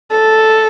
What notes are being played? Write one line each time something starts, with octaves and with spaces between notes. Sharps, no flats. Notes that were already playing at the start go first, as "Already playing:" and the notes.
A4